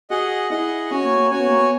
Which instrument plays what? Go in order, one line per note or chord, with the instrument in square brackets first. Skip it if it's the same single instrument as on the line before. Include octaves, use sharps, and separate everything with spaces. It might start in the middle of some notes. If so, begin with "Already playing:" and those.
[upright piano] F#4 [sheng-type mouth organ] G#4 D#5 F#5
[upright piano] E4 [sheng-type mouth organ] G#4 D#5 F#5
[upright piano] C#4 [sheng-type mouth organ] F#4 C#5 G#5
[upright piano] A#3
A#3
[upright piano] C#4 [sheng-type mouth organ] F#4 C#5 G#5
[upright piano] B3
A#3
B3